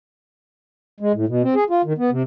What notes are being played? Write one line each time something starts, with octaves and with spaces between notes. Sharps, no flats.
G#3
A2
B2
C4
G#4
F4
D#3
B3
C3